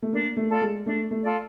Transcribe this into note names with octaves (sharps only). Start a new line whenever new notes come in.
A3
A#3 D4
A3
F4 A4 D5
G#3
A3 D4
A3
F4 A4 D5